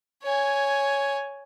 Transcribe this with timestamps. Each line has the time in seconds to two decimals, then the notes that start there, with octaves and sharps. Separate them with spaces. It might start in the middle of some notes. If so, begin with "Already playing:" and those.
0.23 C#5 G#5